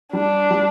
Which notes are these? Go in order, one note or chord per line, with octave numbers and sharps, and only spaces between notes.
G3 D4
G3